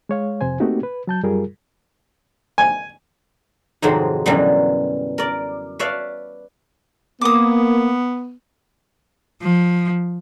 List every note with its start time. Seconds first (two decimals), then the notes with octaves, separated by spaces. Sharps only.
0.09 G#3 C#5 F5
0.41 F2 C3 C5 G#5
0.60 A3 A#3 C4 D#4 F#4 G4
0.83 B4
1.07 F#3 A5 G6
1.23 F#2 G3 F4 G#4 A#4
2.58 G#5
3.82 F2 G#2 C3 D#3 F#3 C4
4.26 F#2 B2 D3 E3 F#3 G3
5.18 A#4 D5
5.79 B4 C#5 D5 E5 F5 A5
7.21 A#3 B3 D6 D#6
9.42 F3